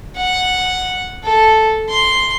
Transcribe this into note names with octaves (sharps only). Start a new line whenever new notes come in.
F#5
A4
C6